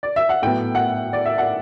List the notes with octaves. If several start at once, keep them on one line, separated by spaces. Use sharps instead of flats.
D5
E5
F#5
A2 F#3 B3 G5
F#5
D5
E5
F#5